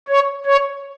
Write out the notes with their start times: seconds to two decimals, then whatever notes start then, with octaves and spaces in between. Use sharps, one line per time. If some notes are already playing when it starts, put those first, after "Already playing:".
0.08 C#5
0.45 C#5